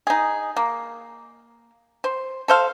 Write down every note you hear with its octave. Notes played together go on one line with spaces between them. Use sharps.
D#4 G#4
A#3
C5
A4 C5 F5